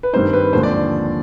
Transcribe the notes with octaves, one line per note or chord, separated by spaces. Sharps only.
B4
G2 D#3 G3 C4 D#4 C5
B4
D#2 D3 F3 G#3 C4 C5
D5